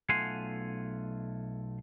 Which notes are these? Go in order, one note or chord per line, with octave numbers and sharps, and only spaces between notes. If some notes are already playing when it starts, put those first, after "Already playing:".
B1 A3 F4 F#5 G#5 C6